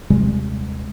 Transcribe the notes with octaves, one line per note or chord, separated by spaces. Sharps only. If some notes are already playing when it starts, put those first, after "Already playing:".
D#1 C3 G3 G#3